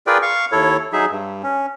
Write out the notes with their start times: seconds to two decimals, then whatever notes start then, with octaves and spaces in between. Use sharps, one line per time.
0.07 F4 G#4 A#4 B4 D5 G5
0.22 F5 C#6
0.52 D#2 E4 A4 C#5
0.93 F#3 D#4 G#4 E5
1.11 G2
1.43 C#4